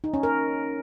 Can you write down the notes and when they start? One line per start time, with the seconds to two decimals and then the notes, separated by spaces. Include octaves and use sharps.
0.04 D#4
0.14 C#4
0.23 A#4